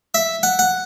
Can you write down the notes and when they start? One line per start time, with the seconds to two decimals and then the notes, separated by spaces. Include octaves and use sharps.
0.14 E5
0.43 F#5
0.59 F#5